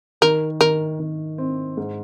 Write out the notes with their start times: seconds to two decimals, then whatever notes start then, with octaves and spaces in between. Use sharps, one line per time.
0.22 D#3 A#4
0.61 D#3 A#4
0.99 D#3
1.38 C4
1.77 G#2